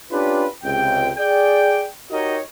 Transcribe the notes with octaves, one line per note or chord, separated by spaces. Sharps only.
C#4 D4 F4 G4 B4
C#2 C3 G5
G#4 D5 G5
D#4 F#4 G4 A#4 C#5 D#5